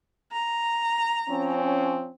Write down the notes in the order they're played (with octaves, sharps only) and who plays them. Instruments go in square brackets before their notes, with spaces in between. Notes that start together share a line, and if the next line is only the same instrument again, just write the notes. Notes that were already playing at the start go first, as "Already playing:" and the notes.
[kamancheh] A#5
[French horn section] F3 C4 C#4